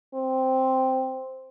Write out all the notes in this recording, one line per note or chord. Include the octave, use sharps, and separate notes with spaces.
C4